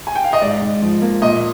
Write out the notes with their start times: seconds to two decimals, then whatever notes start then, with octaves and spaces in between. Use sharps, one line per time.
0.07 G#5
0.15 G5
0.24 F5
0.33 D#5
0.42 G#2 D5
0.62 G#2
0.82 F3
1.02 A#3
1.22 A#2 D#5